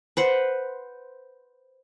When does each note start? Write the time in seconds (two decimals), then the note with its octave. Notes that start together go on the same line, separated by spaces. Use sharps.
0.17 B4 C5 F#5